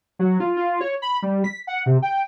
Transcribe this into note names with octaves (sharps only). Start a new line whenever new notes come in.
F#3
F4
F4
C#5
B5
G3
B6
F#5
C3
G5